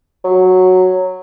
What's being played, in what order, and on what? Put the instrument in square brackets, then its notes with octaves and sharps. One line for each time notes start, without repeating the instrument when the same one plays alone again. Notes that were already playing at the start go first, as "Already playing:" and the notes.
[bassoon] F#3